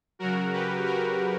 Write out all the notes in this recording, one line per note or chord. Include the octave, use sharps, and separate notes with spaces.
C#3 F#3 F#4 A#4
G4 B4
F#4 A#4